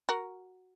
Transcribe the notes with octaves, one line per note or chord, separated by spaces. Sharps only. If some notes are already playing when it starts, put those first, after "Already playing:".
F#4 A#4